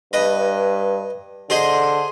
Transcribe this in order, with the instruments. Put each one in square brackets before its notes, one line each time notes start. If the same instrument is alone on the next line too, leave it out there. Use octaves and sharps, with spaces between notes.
[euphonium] G2 [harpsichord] B4 D#5
[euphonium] D3 [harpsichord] G#4 C5 D#5